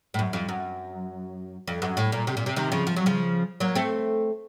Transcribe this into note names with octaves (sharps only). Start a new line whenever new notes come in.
A2
F#2
F2
F#2
F2
F#2
A2
A#2
C3
A#2
C3
C3 D#3
C#3 F3
F3
F#3
C#3 F3
F#3 A#3
A3 C4